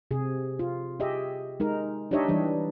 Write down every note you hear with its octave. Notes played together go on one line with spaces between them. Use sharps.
C3 G#4
F4
G4 G#4 D#5 E5
G#3 D#4 A#4
D4 D#4 G4 C#5 D#5 E5
E3 G3 D4